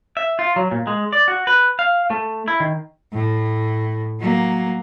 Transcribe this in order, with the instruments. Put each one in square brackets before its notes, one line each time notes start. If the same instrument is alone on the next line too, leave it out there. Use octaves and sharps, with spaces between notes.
[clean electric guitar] E5
F4
F#3
A#2
G#3
D5
F#4
B4
F5
A3
E4
D#3
[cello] A2
F#3 A#3